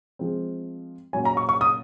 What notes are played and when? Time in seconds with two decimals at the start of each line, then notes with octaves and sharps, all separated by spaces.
0.19 F3 G#3 C4
1.13 A#2 F#3 C#4 G#5
1.25 A#5
1.37 C#6
1.49 C#6
1.61 D#6